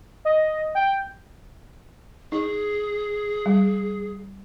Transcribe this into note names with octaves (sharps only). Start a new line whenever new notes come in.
D#5
G5
D#4 G#4
G3